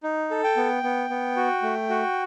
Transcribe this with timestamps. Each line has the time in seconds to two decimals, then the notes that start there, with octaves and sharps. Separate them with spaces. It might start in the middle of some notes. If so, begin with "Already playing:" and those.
0.03 D#4
0.31 A4
0.44 G5
0.57 B3
0.83 B3
1.10 B3
1.36 F#4
1.62 A3
1.89 F#4